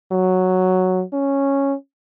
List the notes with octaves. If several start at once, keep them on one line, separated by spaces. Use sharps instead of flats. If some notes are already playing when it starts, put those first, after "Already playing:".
F#3
C#4